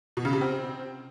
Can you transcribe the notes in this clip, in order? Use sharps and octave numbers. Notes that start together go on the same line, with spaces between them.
B2
C#3
C3
C4